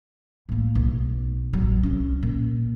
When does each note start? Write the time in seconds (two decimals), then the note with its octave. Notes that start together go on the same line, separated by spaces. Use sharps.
0.49 A2 A#3
0.75 B1
1.53 A1 F#3
1.83 C2 C#4
2.23 A#2